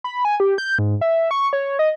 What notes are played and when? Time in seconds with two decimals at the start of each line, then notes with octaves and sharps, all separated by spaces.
0.04 B5
0.25 G#5
0.40 G4
0.58 G6
0.79 G#2
1.01 E5
1.31 C#6
1.53 C#5
1.79 D#5